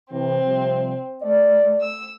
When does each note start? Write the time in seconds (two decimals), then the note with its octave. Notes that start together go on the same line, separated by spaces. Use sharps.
0.12 C3 E3 C4
0.45 C3 F3 G3
1.23 A3 D5
1.80 E6